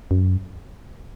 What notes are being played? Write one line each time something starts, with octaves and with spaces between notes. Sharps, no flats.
F#2